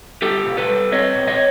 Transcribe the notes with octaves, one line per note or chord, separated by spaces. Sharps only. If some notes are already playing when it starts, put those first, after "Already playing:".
G3 G4 A4
B2
A4 B4
G3
C4 C#5 D#5
B2
C#5 D#5